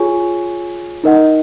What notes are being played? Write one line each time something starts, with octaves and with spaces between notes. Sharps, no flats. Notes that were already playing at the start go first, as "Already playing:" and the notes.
Already playing: F4 G#4 C#5 G#5 C#6
D#4 A#4 D#5 F#5